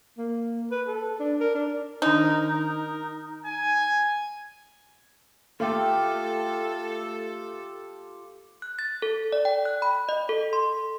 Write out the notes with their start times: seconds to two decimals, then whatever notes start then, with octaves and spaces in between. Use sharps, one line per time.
0.18 A#3
0.71 B4
0.87 A4
1.20 D4
1.40 A#4
1.55 D4
2.02 D#3 D4 D#4 A#4
3.46 G#5
5.60 A3 F4 G4 A4
8.62 F#6
8.79 A6
9.02 A4
9.32 D5
9.45 G5
9.65 F#6
9.82 B5
10.09 D#5
10.29 A4
10.53 C6